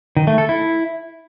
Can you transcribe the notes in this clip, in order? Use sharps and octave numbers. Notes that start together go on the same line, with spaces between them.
D#3
A3
A4
E4